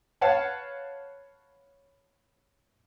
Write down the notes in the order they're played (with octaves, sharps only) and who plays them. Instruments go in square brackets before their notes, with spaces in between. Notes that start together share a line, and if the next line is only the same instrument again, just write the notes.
[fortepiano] B4 C#5 F5 F#5 A5